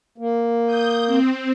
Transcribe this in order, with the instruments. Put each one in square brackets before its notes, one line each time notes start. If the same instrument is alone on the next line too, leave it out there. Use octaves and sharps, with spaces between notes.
[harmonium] A#3
[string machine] D#6 G6
C4